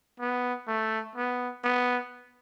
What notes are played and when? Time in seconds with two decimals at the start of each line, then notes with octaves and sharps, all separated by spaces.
0.20 B3
0.68 A3
1.16 B3
1.64 B3